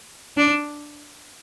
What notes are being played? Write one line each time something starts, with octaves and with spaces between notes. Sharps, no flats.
D4